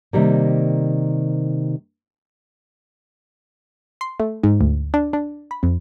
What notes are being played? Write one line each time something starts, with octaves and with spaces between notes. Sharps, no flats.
C3 D#3 G3 A#3
C6
A3
G#2
D2
D4
D4
B5
F2